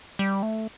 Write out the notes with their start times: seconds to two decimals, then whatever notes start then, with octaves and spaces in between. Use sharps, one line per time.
0.19 G3
0.43 A3